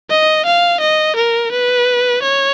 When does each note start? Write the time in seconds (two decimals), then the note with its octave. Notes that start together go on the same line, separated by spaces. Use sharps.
0.10 D#5
0.46 F5
0.81 D#5
1.16 A#4
1.52 B4
2.23 C#5